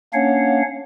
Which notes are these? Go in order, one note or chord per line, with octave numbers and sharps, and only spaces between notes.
A#3 C#4 D4 C#5 F5 F#5